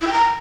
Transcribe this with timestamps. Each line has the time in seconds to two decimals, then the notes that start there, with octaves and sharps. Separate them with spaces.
0.01 E4
0.07 G5
0.13 A#5